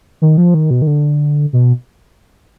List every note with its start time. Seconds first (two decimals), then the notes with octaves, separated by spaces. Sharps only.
0.22 D#3
0.38 F3
0.54 D#3
0.71 B2
0.82 D#3
0.87 D3
1.53 B2